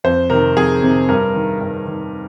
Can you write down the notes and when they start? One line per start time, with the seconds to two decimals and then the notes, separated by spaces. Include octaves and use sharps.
0.04 F2 C5
0.30 C3 D#3 A#4
0.56 F2 G#4
0.83 C3 D#3
1.09 G2 A#4
1.35 D#3
1.61 G2
1.87 D#3